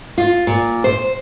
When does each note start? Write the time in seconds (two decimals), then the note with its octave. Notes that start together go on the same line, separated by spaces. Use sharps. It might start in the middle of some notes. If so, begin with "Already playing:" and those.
0.18 F4
0.47 A#2
0.84 C5